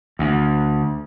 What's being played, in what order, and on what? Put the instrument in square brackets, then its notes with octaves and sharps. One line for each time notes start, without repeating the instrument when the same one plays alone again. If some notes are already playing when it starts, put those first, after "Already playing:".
[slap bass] D2